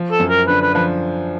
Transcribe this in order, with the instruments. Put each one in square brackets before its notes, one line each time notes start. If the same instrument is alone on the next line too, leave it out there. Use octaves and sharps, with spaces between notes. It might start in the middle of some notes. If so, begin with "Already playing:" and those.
Already playing: [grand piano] F3
[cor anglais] A4
[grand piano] F#2
[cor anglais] A#4
[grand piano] D3 [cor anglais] B4
[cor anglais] B4
[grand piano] F3 [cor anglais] B4